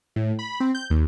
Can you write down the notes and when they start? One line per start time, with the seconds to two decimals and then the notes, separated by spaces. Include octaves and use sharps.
0.16 A2
0.39 B5
0.60 C4
0.75 G6
0.90 D#2